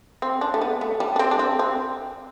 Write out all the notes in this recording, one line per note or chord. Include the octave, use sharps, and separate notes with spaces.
C4
D4
A3
B3
A3
G3
D4
C4
D4
C4
C4